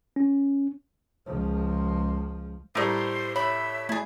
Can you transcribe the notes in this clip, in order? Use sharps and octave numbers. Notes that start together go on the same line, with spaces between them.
C#4
C#2 F3
A2 G3 A#4 C5 D#5
C#5 E5 B5
A3 E4 G#4 A6